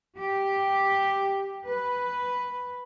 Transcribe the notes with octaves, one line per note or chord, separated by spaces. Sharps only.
G4
B4